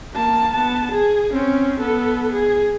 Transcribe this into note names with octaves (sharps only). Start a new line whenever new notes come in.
A#3 A5
B3 A5
G#4
C4 C#4
B3 A4
G#4